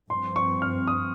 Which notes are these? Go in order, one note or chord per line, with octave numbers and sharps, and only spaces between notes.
G2 F3 C4 C6
C#6
F6
D#6